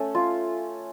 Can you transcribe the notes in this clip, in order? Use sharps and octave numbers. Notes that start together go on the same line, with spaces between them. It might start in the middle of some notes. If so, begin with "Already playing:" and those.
Already playing: A3 C#4
F4